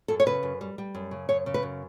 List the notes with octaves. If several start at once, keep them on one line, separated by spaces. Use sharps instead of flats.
F#2 A4
C#5
C#3 B4
F#2
G3
G3
F#2
C#3
F#2 C#5
C#3
B4
F#2